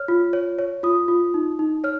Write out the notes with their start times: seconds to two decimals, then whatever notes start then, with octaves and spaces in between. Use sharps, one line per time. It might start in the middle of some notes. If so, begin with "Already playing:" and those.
Already playing: C#5 F6
0.08 F4
0.33 C#5
0.59 C#5
0.83 F4 D#6
1.08 F4
1.34 D#4
1.59 D#4
1.84 C#5 F6